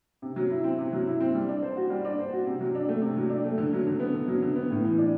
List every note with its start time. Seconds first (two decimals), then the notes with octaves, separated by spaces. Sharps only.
0.22 C3
0.36 F#3
0.50 E4
0.64 C4
0.79 C3
0.93 F#3
1.07 E4
1.20 C4
1.35 G3
1.49 D4
1.63 C5
1.77 F#4
1.90 G3
2.05 D4
2.19 C5
2.33 F#4
2.47 C3
2.61 F#3
2.75 D4
2.89 A3
3.02 C3
3.17 F#3
3.30 D4
3.44 A3
3.58 D3
3.73 F#3
3.87 D3
4.00 B3
4.14 D3
4.28 F#3
4.42 D3
4.56 B3
4.70 A2
4.84 E3
4.98 D4